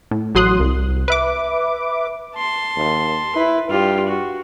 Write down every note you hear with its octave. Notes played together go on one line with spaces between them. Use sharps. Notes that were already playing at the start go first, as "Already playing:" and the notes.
A2
A1 F#3 C6 D#6 F#6
C2
B4 E5 D6
A5 C6
D#2
E4 B4
G2 F4 G4
F#4